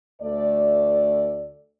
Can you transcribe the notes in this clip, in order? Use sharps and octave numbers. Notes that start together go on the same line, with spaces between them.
D2 A3 D5